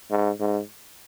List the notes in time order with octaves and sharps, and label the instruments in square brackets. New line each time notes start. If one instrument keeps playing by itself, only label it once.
[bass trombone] G#2
G#2